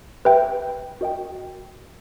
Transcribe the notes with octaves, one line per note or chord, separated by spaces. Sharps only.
G4 B4 E5 G5
F#4 A#4 D#5 G5